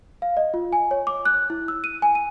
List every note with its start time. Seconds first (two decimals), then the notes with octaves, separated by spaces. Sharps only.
0.22 F5
0.37 D#5
0.54 F4
0.72 G#5
0.91 C#5
1.07 D6
1.25 F#6
1.50 E4
1.68 E6
1.84 D#7
2.02 G#5
2.15 D#7